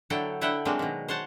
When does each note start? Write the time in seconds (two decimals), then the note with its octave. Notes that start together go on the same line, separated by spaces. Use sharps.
0.10 D3 F#3 E4 A4 G5
0.41 D3 E4 B4 E5 F#5 G5
0.65 F#3 G#3 A#3 C4 D4
0.79 B2 D#3
1.08 C5 C#5 F#5 A5